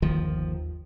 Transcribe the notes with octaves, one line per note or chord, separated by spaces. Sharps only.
G1 D#2 D#3 F3